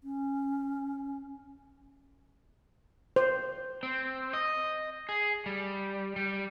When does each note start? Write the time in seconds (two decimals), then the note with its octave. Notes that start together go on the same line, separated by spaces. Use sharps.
0.04 C#4
3.16 C5
3.83 C4
4.33 D#5
5.09 G#4
5.46 G3
6.16 G3